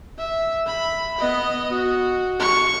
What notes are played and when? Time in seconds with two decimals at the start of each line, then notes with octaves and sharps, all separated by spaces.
0.18 E5
0.66 B5
1.18 B3 D#5
1.72 F#4
2.39 C#6